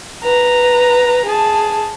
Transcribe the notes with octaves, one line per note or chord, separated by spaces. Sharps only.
B4 A#5
G#4 A5